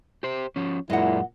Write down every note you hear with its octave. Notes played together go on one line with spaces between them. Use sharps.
G4 C5
F3 C#4
F#2 A#2 G#3 E4 D#5 F#5